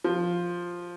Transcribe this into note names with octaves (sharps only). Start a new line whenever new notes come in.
F3